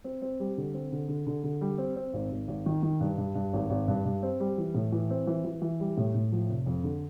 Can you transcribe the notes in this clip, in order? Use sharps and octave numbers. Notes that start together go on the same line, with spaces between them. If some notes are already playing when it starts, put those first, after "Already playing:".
C4
C4
G3
D3
C4
D3
D3
D3
D3
G3
C4
C4
G#1
G#1
G#1
D#3
D#3
G2
G2
G2
G#1
G#1
G2
G2
C4
G3
E3
A2
E3
C4
E3
E3
E3
G3
A2
A2
F3
F1
F2
D3